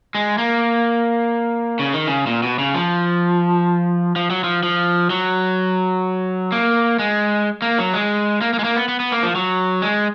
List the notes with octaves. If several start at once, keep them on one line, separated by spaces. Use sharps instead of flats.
G#3
A#3
C#3
D#3
C#3
A#2
B2
C#3
F3
F3
F#3
F3
F3
F#3
A#3
G#3
A#3
F#3
G#3
A#3
A#3
G#3
A#3
B3
B3
B3
A#3
F3
F#3
G#3